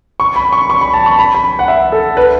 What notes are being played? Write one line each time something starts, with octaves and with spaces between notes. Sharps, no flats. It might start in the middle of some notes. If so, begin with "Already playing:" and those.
C#6
B5
C#6
C#6
B5
A5
C#6
B5
B5
F#5
E5
A4
B4